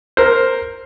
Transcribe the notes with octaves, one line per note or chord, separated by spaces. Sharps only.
A#4 C5